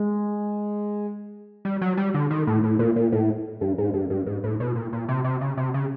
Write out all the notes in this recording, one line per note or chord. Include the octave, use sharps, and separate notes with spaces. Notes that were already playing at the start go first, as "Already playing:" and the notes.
Already playing: G#3
G3
F#3
G3
D3
D#3
A2
A2
A#2
A#2
A2
G2
G#2
G2
G2
G#2
A2
B2
A#2
A#2
C3
C3
C#3
C3
C#3